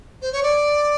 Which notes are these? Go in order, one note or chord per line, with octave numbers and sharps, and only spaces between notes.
C5
C#5
D5